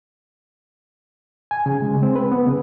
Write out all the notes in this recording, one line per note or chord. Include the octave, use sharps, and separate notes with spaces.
G#5
C#3
G#3
C4
B4
B3
C#3